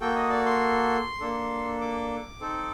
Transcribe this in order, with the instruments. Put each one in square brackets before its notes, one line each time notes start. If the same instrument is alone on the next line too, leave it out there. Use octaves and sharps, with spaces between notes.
[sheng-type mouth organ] A#3 F#4 A4 G5
D#5
D5
C6
A#3 D4 A4
D6
C4 D#4 A4